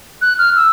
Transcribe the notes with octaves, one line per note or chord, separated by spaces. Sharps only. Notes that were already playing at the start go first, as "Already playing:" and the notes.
F#6
F6
E6